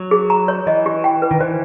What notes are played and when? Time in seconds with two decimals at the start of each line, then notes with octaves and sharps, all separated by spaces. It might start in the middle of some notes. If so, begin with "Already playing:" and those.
Already playing: F#3
0.11 G#4
0.30 A#5
0.48 C#5
0.66 E3 D#5
0.86 G4
1.04 G5
1.22 B4
1.31 D#3
1.41 E3 C5